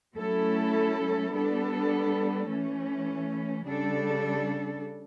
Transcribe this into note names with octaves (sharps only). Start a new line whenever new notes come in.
F#3 A3 C#4 E4 A4
G3 B3 D4 A4
E3 A3 C#4
C#3 G3 D4 A4